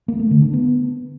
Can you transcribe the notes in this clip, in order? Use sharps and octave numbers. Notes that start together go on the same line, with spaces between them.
A#3
A3
D3
D4
B3